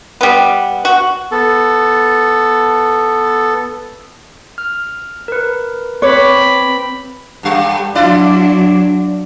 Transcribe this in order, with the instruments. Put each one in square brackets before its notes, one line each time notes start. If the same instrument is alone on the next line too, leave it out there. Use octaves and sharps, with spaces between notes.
[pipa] G3 B3
F#4
[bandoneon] B3 A4
[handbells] F6
A#4 B4
[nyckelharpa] C4 B5 [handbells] B4 D6 [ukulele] C#5
[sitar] G2 G3
[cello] F#3 D4 [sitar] E4 D5